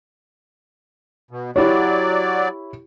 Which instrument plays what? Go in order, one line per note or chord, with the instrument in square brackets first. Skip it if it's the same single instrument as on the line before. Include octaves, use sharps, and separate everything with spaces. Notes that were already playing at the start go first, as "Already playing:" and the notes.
[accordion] B2
[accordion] F#3 D5 [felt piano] E4 G4 C#5